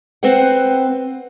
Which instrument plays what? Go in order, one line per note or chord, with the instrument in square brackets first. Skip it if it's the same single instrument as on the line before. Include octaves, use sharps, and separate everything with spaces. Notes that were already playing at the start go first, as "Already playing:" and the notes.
[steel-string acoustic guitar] C4 B4 C5 F#5